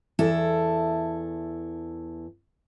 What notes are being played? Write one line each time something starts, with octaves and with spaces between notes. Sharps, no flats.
E2 E4 A4